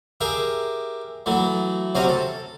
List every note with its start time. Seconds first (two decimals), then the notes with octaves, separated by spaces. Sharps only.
0.21 G4 G#4 A#4 E5
1.26 E3 F#3 A3
1.95 C3 F#3 C4 C#4 C#5 A#5
2.08 A4